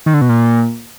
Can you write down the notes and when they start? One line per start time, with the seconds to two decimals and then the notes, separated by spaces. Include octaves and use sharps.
0.06 D#3
0.14 D3
0.21 B2
0.29 A#2